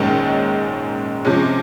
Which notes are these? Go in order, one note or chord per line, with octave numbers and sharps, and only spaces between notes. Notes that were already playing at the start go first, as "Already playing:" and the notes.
Already playing: A#1 G#2 D#3 G#3 C#4
C3 F3 G#3 C#4